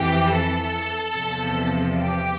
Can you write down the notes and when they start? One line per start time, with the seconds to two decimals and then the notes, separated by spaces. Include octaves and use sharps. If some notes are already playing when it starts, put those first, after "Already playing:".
Already playing: F2 E3 G4
0.33 A4
1.15 E2 C3 F3
1.97 G4